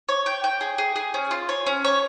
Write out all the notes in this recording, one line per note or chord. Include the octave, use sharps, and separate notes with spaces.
C#5
G5
G5
G#4
G#4
G#4
C#4
F4
C#5
C#4
C#5